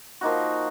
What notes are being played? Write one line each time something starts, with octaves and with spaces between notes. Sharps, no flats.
F3 A#3 D#4 F#4